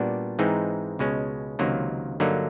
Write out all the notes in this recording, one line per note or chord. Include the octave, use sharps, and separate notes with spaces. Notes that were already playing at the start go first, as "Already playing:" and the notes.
Already playing: A#2 G3 B3 D4 F#4
G#2 E3 G#3 C4 D#4
C#2 B2 G#3 C#4
C#2 C3 D#3 F#3 A#3
G2 D3 F#3 A#3 D#4